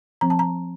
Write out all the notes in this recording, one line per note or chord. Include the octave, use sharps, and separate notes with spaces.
F3 C4 A#5
A5
A#5